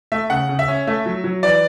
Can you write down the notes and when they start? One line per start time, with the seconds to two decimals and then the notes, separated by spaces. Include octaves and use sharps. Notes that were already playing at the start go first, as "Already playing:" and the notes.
0.12 A3 E5
0.30 C#3 F#5
0.49 C#3
0.59 E5
0.68 C#4
0.87 A3 E5
1.06 F#3
1.24 F#3
1.43 E3 D5